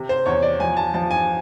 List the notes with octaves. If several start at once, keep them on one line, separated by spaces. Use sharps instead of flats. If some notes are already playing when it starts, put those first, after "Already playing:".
Already playing: C3
C5
E2 C#5
D5
F3 G#5
A5
F3 A5
G#5